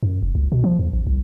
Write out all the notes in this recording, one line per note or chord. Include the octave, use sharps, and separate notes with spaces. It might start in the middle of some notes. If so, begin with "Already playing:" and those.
F#2
F1
C#2
B2
F3
E2
A1
C2